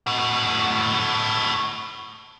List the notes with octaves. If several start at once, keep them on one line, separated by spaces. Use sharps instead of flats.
A2 F#4